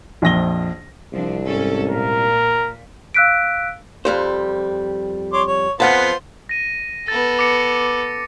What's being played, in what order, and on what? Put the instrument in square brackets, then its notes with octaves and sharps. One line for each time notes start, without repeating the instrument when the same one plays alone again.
[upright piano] A#1 F2 A#6 G7
[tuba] C2 [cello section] F3 C4 D4
[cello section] G#2 C#4 A4
[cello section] A#2 [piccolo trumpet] A#4
[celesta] F5 E6 F#6 B6 D7
[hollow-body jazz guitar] F2 G3 C5
[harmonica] C#5 C6 D6
C#5
[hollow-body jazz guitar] F2 F#5 A5 [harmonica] B3 F4 C5
[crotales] A#6 D#7
[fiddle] B3 A4 [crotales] A6
[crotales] D6 A#6 C#7